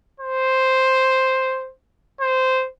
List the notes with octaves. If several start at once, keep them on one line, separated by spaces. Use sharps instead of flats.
C5
C5